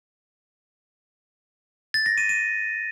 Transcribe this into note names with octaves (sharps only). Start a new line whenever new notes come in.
A6
A#6
D#7
D#7